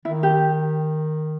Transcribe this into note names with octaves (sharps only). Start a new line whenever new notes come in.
D#3 E4
G4